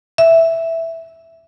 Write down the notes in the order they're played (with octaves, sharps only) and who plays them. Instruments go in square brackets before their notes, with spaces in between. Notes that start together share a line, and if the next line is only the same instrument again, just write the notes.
[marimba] E5